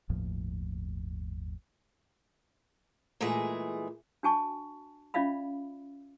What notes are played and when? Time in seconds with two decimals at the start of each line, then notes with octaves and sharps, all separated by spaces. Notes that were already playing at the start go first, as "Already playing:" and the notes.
0.09 G1 D#2 A2 F3
3.21 A#2 E3 G#3 A3 G#4
4.23 D4 F#4 G#5 A5 C#6
5.14 C#4 F4 D5 E5 F5 B5